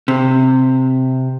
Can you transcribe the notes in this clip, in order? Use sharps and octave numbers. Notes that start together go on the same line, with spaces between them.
C3